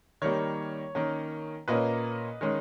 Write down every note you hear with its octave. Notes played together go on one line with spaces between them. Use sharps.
D#3 G3 A#3 C#5
D#3 A#3 C#4
A#2 A#3 C#4 B4 D#5
D#3 G#3 C#4